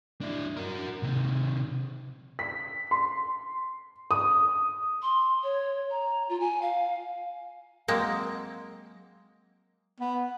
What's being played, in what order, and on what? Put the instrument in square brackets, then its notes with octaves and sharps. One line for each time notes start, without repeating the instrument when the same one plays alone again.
[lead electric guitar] D4 E4
F#4 A#4
C3 D#3
[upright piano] B6
C6
D#6
[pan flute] C6
C#5
A#5
F4
G#5
F5
[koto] F#3 G#3 A#3 C4
[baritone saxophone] B3